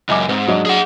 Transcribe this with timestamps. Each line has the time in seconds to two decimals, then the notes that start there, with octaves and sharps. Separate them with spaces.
0.09 C#2 F#2 D#5 G#5 D6
0.29 G#2 C4
0.48 F#3 D4 D#5
0.66 G#4 F#5